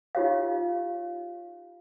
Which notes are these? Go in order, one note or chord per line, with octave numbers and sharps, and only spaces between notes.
D#4 F4 G4 C#5 F5